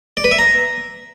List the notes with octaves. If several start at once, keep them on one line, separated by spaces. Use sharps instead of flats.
D5
B4
E5
A#5